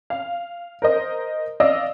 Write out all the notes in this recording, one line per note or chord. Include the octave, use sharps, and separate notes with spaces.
F5
A#4 C5 D#5
D5 D#5 F5 E6